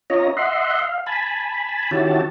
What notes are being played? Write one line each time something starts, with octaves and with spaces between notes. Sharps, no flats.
C#4 F4 C#5 D#5 A#5
D#5 E5 F#5 C6
F5
G#5 A5 B5
D#3 C#4 E4 F#4 G4 A5